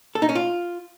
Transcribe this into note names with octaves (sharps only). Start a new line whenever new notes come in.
A4
D#4
C#4
F4